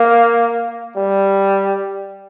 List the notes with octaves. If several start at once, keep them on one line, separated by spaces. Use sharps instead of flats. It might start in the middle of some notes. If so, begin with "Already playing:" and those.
Already playing: A#3
G3